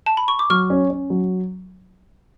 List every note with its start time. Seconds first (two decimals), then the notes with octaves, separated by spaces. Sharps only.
0.06 A5
0.17 B5
0.28 C#6
0.39 D6
0.50 F#3 C#6 F6
0.70 C#4
0.90 C#4
1.10 F#3